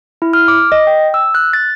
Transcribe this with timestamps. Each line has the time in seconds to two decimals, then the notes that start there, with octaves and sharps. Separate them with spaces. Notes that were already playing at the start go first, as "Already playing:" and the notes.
0.22 E4
0.33 F6
0.48 D6
0.72 D#5
0.87 G5
1.14 E6
1.35 F#6
1.53 A6